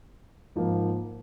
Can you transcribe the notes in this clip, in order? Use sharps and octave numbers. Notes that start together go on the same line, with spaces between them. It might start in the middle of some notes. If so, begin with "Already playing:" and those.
G#2 F3 A#3